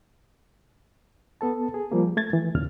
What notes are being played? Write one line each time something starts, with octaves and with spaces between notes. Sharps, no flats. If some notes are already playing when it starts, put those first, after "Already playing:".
B3 A4 A5
G#4
F3 G3 A#3
A3 G#6 A6
E3
D#2 A#2 C#3 F6